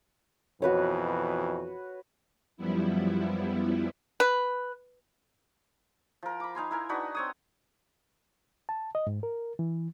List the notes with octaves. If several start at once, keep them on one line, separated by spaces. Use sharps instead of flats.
F2 B2 E3 F#4 B4 C#5
F#2 F3 G3 B3 E4
B4
F3 A#4
B5 D6
D#4 F5 G#5 C6
E4 A#4 G#5
D4 D#4 F#4 B4
C4 C#5 D#6
A5
D#5
G#2
A#4
E3